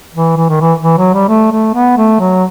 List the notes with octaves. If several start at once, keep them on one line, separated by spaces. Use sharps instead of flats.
E3
E3
D#3
E3
E3
F#3
G3
A3
A3
B3
A3
F#3